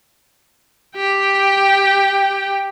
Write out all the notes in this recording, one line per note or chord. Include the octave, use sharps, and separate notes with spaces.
G4 G5